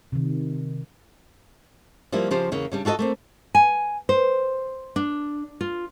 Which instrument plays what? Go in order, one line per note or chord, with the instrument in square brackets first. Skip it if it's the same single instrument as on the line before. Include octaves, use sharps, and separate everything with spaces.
[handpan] C3 D#3
[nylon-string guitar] F3 G3 A#3 E4
C#3 F3 G4 C5
E2 C#3 A#3
C#3 G3 D4
F4 F#4 A4 C#5 D#5
A3 A#3 C4
G#5
C5
D4
F4